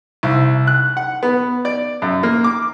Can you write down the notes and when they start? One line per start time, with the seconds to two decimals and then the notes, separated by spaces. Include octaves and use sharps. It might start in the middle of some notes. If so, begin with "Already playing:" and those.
0.23 C2
0.67 F#6
0.97 F#5
1.23 B3
1.65 D5
2.02 F#2
2.23 A#3
2.44 D6